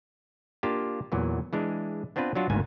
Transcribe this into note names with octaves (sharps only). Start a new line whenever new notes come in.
A#3 D4 F4 G4
E2 A#2 E3 F#3
E3 G#3 D4
B3 C4 D4 F4 B4
F#3 D4 F4 F#4
G#1 D2 G#2 A#3 B3 G#5